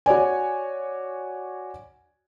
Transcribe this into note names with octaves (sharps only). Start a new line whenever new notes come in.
F#4 C#5 D5 G#5